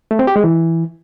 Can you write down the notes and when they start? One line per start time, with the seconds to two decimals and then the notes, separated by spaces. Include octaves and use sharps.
0.11 A3
0.19 C4
0.27 G4
0.36 G#3
0.44 E3